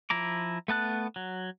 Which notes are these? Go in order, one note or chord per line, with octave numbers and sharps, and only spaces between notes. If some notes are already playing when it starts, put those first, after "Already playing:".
F3 E4 A#5 D6
A3 B3 A5 F#6
F#3